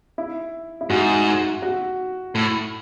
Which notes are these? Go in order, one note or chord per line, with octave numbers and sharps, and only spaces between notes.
E4
E4
G#2 F#4
F#4
A2